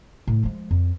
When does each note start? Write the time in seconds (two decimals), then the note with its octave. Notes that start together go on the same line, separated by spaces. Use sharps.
0.27 A2
0.43 F3 G#3
0.71 F2